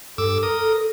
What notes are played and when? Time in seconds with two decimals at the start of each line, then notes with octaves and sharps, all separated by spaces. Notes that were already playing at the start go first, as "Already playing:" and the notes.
0.18 G2 A4 D6 E6
0.43 A#4 D#6